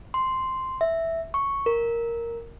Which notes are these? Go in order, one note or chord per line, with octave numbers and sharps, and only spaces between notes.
C6
E5
C#6
A#4